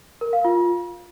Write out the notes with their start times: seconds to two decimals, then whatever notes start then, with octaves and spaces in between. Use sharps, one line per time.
0.21 A#4
0.33 F5
0.45 F4